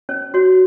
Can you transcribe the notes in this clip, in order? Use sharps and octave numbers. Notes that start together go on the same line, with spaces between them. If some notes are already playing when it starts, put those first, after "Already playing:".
C#4 C#5
F#4 C#5